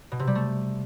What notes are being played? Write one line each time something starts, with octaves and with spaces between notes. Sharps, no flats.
B2
C3
G3
A3